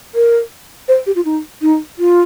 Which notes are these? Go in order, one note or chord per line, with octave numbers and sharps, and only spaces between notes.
A#4
C5
G4
F4
D#4
D#4
F4